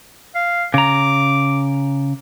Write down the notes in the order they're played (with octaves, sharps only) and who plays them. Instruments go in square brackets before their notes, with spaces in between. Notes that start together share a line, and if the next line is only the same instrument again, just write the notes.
[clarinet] F5
[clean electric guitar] C#3 A#5 [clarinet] D6